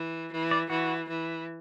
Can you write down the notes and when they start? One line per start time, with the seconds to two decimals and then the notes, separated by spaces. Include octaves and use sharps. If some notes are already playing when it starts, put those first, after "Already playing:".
Already playing: E3
0.32 E3
0.51 D5
0.70 E3 F#4
1.09 E3